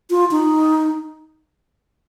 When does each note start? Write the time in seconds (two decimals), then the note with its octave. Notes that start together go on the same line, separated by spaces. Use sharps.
0.11 F4
0.31 D#4